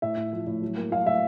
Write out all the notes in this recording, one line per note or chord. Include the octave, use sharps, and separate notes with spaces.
A2 E5
A2
F3
A2
F#3
A#3
F#3 F5
A2 E5